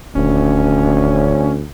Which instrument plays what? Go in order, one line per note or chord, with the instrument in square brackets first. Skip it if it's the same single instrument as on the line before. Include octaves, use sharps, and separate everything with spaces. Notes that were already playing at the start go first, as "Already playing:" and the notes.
[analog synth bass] D#1 [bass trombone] D2 [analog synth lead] C#4